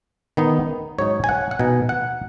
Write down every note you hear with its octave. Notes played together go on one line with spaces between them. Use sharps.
D#3 B3 D#4
G#2 F#3 D#4 C#5
G#5
F#5
F#5
B2 B3 D#4 G#5
F#5